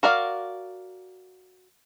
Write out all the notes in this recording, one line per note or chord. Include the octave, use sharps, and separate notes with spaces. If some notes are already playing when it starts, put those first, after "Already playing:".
F#4 A#4 D5 F5